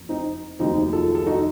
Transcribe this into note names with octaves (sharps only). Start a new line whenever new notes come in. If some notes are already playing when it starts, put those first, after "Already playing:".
Already playing: F#1 F2
C4 D#4
F1 D#2 D#3 F#3 C4 D#4
F4 A4
A4
D#4 F#4